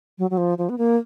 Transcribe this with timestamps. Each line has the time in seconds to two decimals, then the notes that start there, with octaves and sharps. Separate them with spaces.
0.18 F#3
0.30 F#3
0.37 F3
0.58 F3
0.69 B3
0.78 A#3